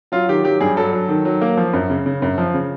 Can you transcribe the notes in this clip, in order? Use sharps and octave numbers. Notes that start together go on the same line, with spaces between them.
F#3 F4
D#3 G4
F#3 G4
G2 G#4
F#3 A4
F#3
D#3
F#3
A#3
F3
F#2
C#3
C#3
F#2
F3
C#3